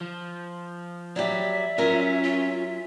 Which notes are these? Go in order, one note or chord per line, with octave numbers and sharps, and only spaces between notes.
F3
F#3 G3 G4 D5 E5
F#3 C#4 F4 A#4
F4